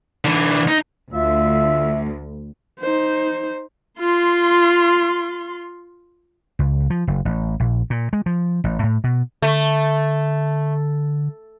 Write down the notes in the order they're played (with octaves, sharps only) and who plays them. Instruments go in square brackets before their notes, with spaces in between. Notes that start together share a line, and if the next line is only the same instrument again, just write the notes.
[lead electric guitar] D3 E3
D#4
[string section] D2 [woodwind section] F4 E5
[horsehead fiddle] D#4 C5
[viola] F4 C6
[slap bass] C#2
F3
F#1
A1
A#1
A#2
G#3
F3
A1
A2
B2
[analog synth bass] D3 [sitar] A3